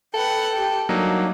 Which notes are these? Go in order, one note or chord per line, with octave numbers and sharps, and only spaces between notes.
A4 B4 F#5 G5
G4 G5
F#3 G3 A#3 D4 D#4